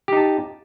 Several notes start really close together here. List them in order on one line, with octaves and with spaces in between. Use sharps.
G4 D#4 A5